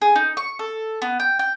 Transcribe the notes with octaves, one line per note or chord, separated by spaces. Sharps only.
G#4
D#4
C#6
A4
B3
G5
G5